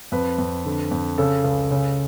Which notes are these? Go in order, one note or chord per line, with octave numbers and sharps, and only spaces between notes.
F2 B4
F2
D3
F2
C#3 A4
C#2
C#3